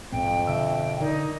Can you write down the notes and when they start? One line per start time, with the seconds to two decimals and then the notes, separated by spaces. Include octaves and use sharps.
0.12 B1 F2 G#2 C4 G5
0.47 B2 D3 E5 E6
1.01 D3 D#4 A#4 D5 D#5